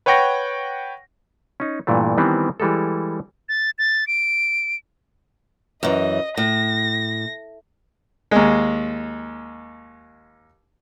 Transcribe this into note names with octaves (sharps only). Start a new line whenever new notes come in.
B4 C#5 F#5 G5 C#6 A#6
C#4 D#4
G2 A#2 E3 G3 A3
D#3 E3 G3 B3 C4
E3 G3 G#3 A4
A6
A6
D7
F#2 E3 D#5
A2 A#6
D#2 G#3